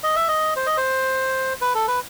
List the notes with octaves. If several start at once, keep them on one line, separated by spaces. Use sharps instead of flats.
D#5
E5
D#5
C5
D#5
C5
B4
A4
B4